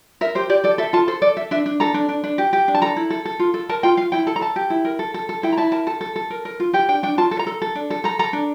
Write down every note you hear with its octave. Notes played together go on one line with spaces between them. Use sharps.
A#4 E5
G4 C5
G4 D5
A4 D5
A4 E5
F4 A5
A4 C5
A4 D5
A4 E5
D4 E5
D4
A4 A#5
D4
D4
D4
G4
G4
D4
A5
A4 A#5
E4
A4
A4
F4
A4
A#4 A5
F4 G5
F4 F5
E4 G5
A4 A5
A#5
A4 A5
G4
E4
A#4
A4
A4
A4
E4 G5
A#5
E4 A5
A#4 A5
A4 A5
A4
A4
A#4
A#4
F4
G4 G5
D4 G5
D4 G5
F4 A5
A4
A#5
A4
A4
D4
A4
A4 A#5
A4 A#5
D4